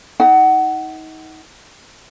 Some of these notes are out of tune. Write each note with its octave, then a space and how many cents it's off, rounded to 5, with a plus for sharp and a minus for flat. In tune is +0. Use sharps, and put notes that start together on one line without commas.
D#4 +30 F#5 +20